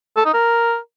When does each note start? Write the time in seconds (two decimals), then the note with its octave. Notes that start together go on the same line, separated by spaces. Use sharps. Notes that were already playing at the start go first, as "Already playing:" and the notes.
0.17 A4
0.25 D#4
0.34 A#4